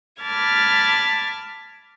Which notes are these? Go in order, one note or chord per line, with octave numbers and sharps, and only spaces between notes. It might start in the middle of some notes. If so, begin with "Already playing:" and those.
A5 B5 D6 F6 G#6 A6